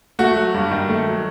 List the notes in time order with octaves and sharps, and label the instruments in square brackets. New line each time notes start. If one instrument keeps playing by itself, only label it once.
[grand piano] A3 F#4
F#3
G2
D#3
A3
F#3